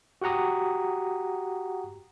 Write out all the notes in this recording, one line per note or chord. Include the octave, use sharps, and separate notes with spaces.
F#4 G4 F#5 A#5 D#6